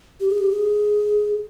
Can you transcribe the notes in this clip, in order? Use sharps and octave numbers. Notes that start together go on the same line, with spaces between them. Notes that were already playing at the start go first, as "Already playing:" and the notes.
G4
G#4
G4
G#4